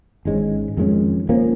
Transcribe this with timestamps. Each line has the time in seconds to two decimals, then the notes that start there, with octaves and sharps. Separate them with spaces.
0.25 G#1 G#2 G#3 C#4
0.77 F2 D#3 G#3 C#4
1.29 F2 F3 A#3 C#4